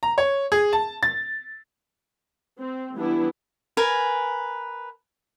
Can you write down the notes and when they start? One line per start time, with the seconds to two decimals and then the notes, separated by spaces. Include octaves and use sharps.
0.03 A#5
0.18 C#5
0.52 G#4
0.73 A5
1.03 A6
2.57 C4
2.96 E3 G3 B3 D4 E4
3.77 A#4 B4 G#5